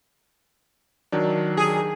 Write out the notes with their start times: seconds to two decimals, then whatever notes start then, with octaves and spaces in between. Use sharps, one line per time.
1.12 D#3 F#3 D4
1.57 G#4